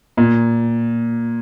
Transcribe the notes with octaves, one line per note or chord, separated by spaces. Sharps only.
A#2